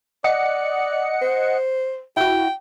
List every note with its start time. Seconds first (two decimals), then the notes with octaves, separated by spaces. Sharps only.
0.24 D5 D#5 F#5 C#7
1.22 C5
2.17 E4 F#4 G5